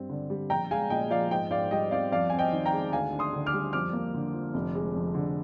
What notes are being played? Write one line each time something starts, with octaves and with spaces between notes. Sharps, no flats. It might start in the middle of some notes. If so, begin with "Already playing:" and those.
Already playing: G2 C4
D3
G3
A#1 G5 A#5
G#3 F5 G#5
A#2 D#5 G5
F3 D5 F5
G#2 D#5 G5
G#2 D5 F5
G3 D#5 G5
C4 D5 F5
F2 D5 F5
C4 G#5
D#5 G5
D#3
G5 A#5
G#3
D2 F5 G#5
D4
C6 D#6
D3
D6 F6
G3
F2 D6 F6
A#3
D3
F3
F1
G#3
F2
D3